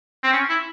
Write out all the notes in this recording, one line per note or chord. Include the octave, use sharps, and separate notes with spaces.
C4
C#4
E4